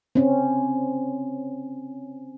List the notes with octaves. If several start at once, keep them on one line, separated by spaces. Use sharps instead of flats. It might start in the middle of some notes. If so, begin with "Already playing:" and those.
C4 C#4